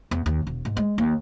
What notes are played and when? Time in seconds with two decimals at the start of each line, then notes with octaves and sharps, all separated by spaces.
0.11 E2
0.26 D#2
0.47 E1
0.65 G#2
0.77 G#3
0.98 D#2